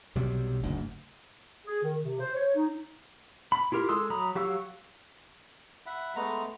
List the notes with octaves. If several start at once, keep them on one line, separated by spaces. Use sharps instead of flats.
B1 C3 F#3 G3
F#1 D2 G#2
G#4
D#3
C3
C5
C#5
D#4
B5
E4 F4 G4 A#4
G#3 A4 C6 D#6 E6
F#3 A#5 B5 D#6
F#3 G4 F5 C#6 E6
E5 F#5 B5
G#3 A3 B3 A#5